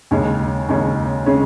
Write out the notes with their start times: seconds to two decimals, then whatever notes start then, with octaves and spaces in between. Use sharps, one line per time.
0.11 D#2 C#3 G#3 C#4
0.69 D#2 C#3 G#3 C#4
1.26 C#3 G#3 C#4